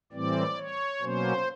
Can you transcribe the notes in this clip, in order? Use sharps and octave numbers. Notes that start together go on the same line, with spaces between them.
A2 E3 G3 C4 D5
C#5
B2 F#3 A#3 C#4 C5